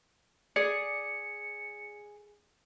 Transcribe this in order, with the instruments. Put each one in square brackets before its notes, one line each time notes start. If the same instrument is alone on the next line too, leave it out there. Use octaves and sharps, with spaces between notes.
[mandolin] G#4 [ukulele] D5 [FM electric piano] C#7